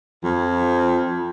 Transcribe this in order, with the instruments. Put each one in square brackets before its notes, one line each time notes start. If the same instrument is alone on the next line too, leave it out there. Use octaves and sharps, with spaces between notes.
[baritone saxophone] F2 [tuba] F3